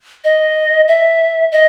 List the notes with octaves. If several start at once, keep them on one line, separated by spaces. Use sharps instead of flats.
D#5
E5
D#5